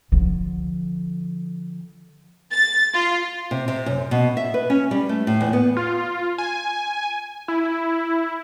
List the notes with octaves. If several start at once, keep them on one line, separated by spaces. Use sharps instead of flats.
D3 F3
A6
F4
C3
C3
F#2
B2
E5
B4
C#4
G3
A3
A2
E2
B3
F4
G#5
E4